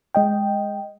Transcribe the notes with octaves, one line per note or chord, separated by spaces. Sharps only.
G#3 D#5 G5